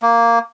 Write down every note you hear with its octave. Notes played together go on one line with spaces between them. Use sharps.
A#3